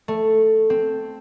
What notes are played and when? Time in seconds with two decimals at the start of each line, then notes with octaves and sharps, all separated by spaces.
0.08 A3
0.70 C4